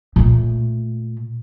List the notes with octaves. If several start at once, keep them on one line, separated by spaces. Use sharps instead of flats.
A#2 A3